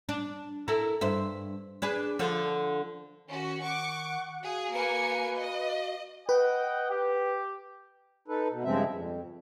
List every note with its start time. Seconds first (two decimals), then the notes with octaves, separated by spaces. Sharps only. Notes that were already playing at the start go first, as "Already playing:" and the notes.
0.09 D4
0.68 E4 A4 A#4
1.01 G2 C5 E5
1.82 D4 G#4 B4
2.19 D3 F3
3.28 D#3 C#4 F#4
3.62 F#5 C#6 D6
4.42 F#4 G#4 F5
4.73 A#3 B4 G#5 C#7
5.37 D#5
6.29 B4 D#5 F#5 G5
6.91 G4
8.28 D#4 A4 B4
8.51 B2
8.64 G2 C#3 F3 G#3 C4 E5
8.90 F2